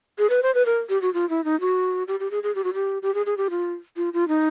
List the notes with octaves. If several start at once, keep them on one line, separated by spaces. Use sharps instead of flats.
G#4
B4
C5
B4
A#4
G4
F#4
F4
E4
D#4
F#4
G4
G4
G#4
G#4
G4
F#4
G4
G4
G#4
G#4
G4
F4
F4
F4
D#4